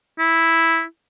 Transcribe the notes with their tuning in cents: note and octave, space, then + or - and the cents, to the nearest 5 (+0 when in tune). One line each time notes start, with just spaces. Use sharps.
E4 -5